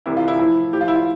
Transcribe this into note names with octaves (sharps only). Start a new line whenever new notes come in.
C2 C3 E3 E4
F4
E4
A2 F3 E4
A2 F3 G4
F4
E4
F4